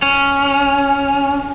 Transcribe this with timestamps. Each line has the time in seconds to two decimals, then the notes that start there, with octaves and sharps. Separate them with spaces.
0.02 C#4